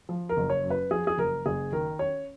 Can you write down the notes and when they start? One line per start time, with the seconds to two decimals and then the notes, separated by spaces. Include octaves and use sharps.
0.09 F3
0.29 A#4
0.37 F#1
0.50 C#5
0.63 F#2
0.70 B4
0.91 F3 G#4
1.07 G#4
1.18 F#1 A#4
1.46 F#1 G#4
1.72 D#3 A#4
1.99 C#4 C#5